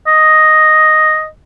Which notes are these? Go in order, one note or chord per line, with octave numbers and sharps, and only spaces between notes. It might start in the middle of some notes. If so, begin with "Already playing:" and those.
D#5